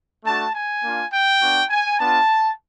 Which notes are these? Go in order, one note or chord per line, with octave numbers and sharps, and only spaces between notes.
A3 D4 F#4 A5
G#5
A#3 D4 F4
G5
B3 D4 F#4
G#5
B3 D4 F4 A5